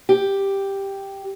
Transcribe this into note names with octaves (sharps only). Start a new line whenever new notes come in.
G4